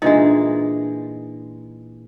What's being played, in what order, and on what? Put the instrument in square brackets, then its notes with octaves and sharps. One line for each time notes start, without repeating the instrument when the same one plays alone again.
[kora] A#2 E3 G#3 [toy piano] D4 D#5 [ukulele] D#4